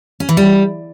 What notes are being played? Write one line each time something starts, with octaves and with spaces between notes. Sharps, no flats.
C#4
E3
G3